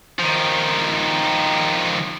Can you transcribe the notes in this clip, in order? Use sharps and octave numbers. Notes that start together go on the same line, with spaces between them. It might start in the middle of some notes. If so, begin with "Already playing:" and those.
D#3 F3